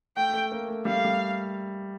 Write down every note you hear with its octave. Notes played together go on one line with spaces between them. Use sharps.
A3 G5
A3
A#3
A3
G3 F5
A3
G3